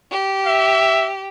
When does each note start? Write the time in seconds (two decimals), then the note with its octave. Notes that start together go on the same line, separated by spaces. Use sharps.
0.11 G4
0.47 E5